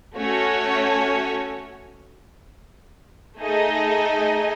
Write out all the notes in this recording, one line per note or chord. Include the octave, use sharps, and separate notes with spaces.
A3 C#4 F#4 C#5
A3 D#4 G#4 D#5